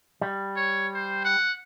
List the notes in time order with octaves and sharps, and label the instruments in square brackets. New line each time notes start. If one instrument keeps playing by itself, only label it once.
[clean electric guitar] G3
[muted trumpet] C#5
C5
F#5